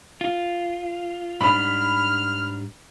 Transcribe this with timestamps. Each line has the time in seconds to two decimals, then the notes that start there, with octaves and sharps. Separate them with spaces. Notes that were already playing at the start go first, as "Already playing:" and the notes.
0.21 F4
1.41 G#2 G3 D4 B5 F6